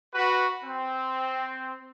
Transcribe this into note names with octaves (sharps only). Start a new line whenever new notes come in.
F#4 B4
C4